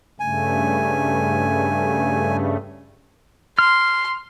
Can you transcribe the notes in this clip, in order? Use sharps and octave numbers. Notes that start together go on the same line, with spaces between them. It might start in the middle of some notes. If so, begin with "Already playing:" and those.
G2 C#3 A3 G#5
C6 F6